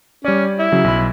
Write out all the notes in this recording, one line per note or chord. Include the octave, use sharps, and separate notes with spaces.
G3 C#4 D5
E4
C#3 F#3
B1 B5